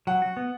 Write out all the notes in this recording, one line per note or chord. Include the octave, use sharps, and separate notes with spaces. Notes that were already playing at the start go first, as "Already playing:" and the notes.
F#3 F#5
F#4
B3